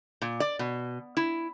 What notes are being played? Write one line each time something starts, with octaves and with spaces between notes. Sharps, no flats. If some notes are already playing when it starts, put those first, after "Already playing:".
A#2
D5
B2
E4